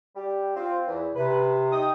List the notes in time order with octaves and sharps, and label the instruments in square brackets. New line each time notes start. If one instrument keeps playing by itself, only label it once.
[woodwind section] G3 G4
C4 F4
E2
[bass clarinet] C3 [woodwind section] B4
[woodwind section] D#4 G5 D#6